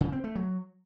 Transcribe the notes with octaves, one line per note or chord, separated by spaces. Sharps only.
C#3
C4
A3
F#3